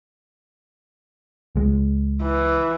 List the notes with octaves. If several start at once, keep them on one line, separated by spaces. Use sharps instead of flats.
C#2 G#3
E3